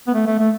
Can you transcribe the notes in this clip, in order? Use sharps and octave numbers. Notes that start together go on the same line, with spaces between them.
B3
A3
A3
A3